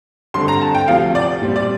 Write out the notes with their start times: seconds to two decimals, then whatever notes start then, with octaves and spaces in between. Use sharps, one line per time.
0.34 G2 D3 A3 C4 C6
0.48 A#5
0.61 A5
0.75 G5
0.88 D2 C3 F3 F5
1.15 D5
1.42 A#2 G3 C4
1.56 D5